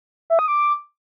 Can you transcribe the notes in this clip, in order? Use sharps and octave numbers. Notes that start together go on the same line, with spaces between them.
E5
D#6
D6